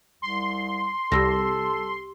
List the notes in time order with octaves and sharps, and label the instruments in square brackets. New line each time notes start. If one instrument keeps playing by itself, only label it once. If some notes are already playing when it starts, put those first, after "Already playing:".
[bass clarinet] C2 [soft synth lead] C6
[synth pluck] C2 G3 [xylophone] G4 E6 A#6 [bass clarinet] A4